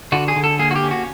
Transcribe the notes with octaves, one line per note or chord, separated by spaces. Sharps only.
D3 F#4
G#4
D3
A4
A#3 G#4
F#4
G4
C#4
F#4